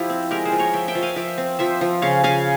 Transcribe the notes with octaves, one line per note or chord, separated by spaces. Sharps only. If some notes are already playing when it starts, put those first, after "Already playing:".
Already playing: F3 E4 G4
C4
G#3 G4 A#4
G#4 C5
F3
A#4 C#5
F3 E5 G5
E5 G5
F3
F5 G#5
F3 E5 G5
C4
F3 C5 E5
F3
C#3 C#5 F5
C#3 F5 G#5